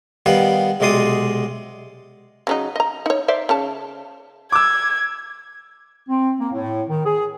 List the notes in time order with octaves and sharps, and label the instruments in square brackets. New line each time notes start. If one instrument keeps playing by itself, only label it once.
[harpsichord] D#3 G3 B3 B4 F5
B1 C3 G#3 D5 C6 D#6
[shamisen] C#3 F#3 D#4
D#5 A#5
D#4 C#5
C5 D5 E5
C#3 C#5 A5
[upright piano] D6 E6 [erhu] G#6
[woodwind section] C4
A#3
A2
D#3
G#4